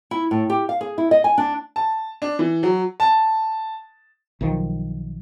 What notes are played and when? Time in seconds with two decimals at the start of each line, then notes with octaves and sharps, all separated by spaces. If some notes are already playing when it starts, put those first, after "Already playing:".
0.11 E4
0.31 A2
0.50 G4
0.69 F5
0.81 G#4
0.98 E4
1.11 D#5
1.24 G#5
1.38 D4
1.76 A5
2.22 D4
2.39 E3
2.63 F#3
3.00 A5
4.41 B1 D#3 F3